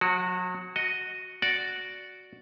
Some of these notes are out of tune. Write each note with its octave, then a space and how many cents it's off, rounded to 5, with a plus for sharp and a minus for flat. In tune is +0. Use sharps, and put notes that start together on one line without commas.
F#3 -35 F#4 +0
F#4 +0 D#5 +0
F#4 +0 D5 -5